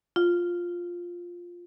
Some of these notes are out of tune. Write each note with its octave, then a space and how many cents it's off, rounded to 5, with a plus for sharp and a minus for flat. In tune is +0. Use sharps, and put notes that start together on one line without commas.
F4 +5